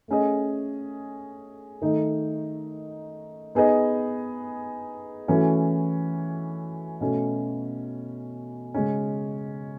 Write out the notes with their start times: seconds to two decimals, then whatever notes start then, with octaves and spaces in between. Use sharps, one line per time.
0.08 A3 C#4 G#4 D#5
1.82 D#3 A3 D#4
3.55 B3 D#4 G#4 B4 D#5
5.28 E3 A3 C#4 F#4
7.01 B2 A3 C#4
8.74 C#3 G#3 C#4